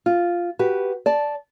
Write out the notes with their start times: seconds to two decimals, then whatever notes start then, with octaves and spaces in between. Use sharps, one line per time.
0.06 F4
0.59 F#4 G4 B4
1.06 D5 A5